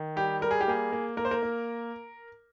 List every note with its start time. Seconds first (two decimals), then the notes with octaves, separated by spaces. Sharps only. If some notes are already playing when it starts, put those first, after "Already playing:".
Already playing: D#3
0.16 G3 G4
0.41 G3 A#4
0.51 G#4
0.61 G4
0.68 A#3 G#4
0.92 A#3
1.17 A#3 A#4
1.25 C5
1.31 A#4
1.43 A#3